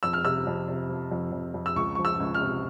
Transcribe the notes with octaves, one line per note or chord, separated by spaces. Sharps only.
F2 E6
F6
C3 E6
F2
C3
F3
F2
F2
F2
E6
C#2 C#6
F3 C#6
E6
C#2
F6
C3